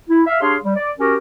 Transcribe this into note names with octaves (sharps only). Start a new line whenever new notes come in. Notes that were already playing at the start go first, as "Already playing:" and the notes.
E4
E5 F5
D4 G4 G#4 C#5 F5 C6
G3
D5
C#4 F#4 G4 A#4